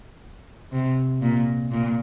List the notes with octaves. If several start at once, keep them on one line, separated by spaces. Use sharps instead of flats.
C3
A#2
A#2